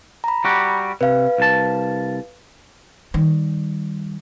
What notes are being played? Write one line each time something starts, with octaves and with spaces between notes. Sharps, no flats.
A#5 B5
G3 F#4 G4
C3 B4 F5
C2 A5
D#3 G3